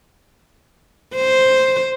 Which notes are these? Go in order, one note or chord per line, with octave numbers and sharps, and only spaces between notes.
C5